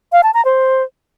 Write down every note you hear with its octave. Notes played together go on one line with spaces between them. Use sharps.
F5
A5
A#5
C5